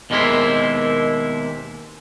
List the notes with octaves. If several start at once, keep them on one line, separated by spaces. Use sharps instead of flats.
D#2 B2 G#3 A#3 C4 E4